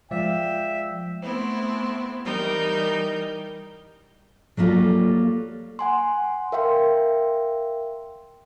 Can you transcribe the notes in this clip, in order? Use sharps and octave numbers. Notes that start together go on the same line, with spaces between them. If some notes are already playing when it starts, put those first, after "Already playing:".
F3 G#3 D5 E5 F5 G5
A3 B3 C4 E4
E3 G3 D#4 A#4 G6
F#3 G3 A#3 F4 A4
F#5 G#5 C6
A#4 E5 F5 G5 C6